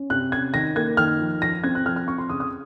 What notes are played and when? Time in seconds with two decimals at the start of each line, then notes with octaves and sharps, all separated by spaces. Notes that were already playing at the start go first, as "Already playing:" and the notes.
Already playing: C#4
0.10 C3 F#6
0.32 C#4 G#6
0.54 D#3 A#6
0.76 A#3 G#6
0.97 D#3 F6
1.19 F3
1.41 F3 A#6
1.64 C4 G#6
1.75 F#6
1.85 F3 F6
1.96 F6
2.07 C4 C#6
2.18 C6
2.30 C#3 D#6
2.40 D#6